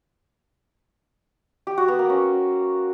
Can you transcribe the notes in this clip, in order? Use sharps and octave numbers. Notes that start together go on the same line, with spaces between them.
G4
F#4
B3
A#3
C#4